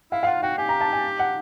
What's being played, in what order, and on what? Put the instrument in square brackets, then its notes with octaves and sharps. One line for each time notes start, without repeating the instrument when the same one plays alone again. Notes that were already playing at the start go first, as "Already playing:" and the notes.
[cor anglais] E4 [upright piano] F5
[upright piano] F5
[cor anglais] F4 [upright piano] F#5
[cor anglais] F#4 [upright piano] G5
[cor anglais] G4 [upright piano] G#5
[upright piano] A#5
A5
G#5
F#5